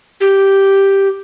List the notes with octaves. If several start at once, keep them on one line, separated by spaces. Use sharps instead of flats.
G4